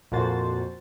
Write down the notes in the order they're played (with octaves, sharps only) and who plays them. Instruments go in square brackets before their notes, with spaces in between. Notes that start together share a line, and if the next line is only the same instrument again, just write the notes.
[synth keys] F2 A#2 A#3 F#4 C5 A6